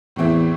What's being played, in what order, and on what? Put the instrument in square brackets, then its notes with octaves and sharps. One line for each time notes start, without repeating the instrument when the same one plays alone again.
[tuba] E2 [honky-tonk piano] A2 E3 C4 E4